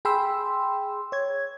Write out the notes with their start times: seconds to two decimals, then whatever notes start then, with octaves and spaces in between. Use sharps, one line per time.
0.05 G#4 G5 B5 C6 E6
1.12 C#5 G#6